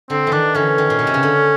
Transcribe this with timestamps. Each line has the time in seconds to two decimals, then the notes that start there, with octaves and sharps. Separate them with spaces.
0.10 D3 C4
0.27 E3
0.32 D#3 D4
0.55 D3 E3 C#4
0.78 D#3
0.90 A#2
0.99 B2
1.07 C3
1.14 C#3
1.23 D3